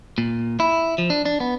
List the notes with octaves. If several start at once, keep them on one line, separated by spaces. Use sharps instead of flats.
A#2
E4
F3
D4
D4
B3